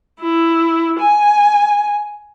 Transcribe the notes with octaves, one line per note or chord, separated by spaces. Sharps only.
E4
G#5